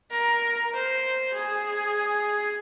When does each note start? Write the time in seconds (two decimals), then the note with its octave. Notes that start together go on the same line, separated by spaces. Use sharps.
0.10 A#4
0.74 C5
1.33 G#4